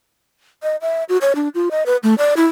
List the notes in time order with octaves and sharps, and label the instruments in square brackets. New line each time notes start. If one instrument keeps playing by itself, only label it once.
[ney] D#5
E5
F#4
C#5
D4
F4
D#5
B4
A3
D5
E4